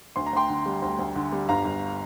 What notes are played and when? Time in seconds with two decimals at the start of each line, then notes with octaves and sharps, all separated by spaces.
0.16 D2 C6
0.27 A#5
0.33 D2 G5 C6
0.50 D3
0.66 G3
0.82 D2
0.99 D2
1.16 D3
1.32 G3
1.49 G1 F5 A#5
1.65 G1